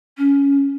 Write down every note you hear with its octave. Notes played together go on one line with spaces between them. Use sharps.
C#4